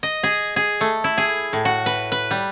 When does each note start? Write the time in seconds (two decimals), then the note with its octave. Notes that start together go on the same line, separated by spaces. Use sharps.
0.03 D#5
0.23 G#4
0.56 G#4
0.81 A3
1.04 E4
1.18 G#4
1.53 A2
1.65 F#4
1.86 B4
2.12 B4
2.31 G3